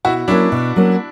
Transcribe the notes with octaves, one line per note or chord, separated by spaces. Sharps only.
B2 E4 F#4
F#3 A#3 C#4 D4 E4
B2
F#3 A#3 C#4